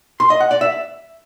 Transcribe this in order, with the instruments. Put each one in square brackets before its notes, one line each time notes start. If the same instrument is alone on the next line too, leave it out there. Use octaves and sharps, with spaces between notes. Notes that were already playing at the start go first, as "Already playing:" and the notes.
[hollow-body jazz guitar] C6
D#5
F#5
D5
E5